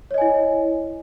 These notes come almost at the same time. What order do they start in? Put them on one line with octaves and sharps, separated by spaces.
C#5 D#5 G#5 E4